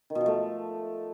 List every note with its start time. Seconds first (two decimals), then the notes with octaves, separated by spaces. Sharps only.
0.10 D#3
0.15 B2
0.21 F3
0.26 A3